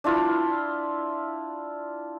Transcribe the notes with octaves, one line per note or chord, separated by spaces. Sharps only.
D4 E4 F4 B4